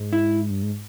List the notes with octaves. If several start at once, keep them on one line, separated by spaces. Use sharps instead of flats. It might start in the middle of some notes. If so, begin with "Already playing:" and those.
Already playing: G#2
E4
G2
G#2